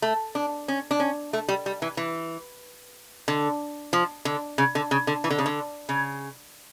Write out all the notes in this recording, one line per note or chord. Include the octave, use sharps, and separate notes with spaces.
A3
D4
C#4
D4
C#4
A3
G3
G3
E3
E3
D3
F3
D3
C#3
D3
C#3
D3
E3
D3
C#3
D3
C#3